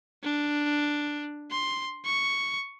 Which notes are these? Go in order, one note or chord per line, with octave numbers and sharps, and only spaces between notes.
D4
C6
C#6